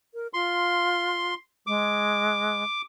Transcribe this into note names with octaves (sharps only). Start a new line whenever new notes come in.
A#4
F4 C6
G#3 D6